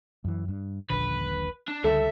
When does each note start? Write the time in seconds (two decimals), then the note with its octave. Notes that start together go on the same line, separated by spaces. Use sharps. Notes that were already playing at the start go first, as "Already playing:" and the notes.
0.25 F#2 E3
0.48 G2
0.90 D#1 A#1 D3 B4
1.68 D4
1.84 C#2 D3 G3 A4 E5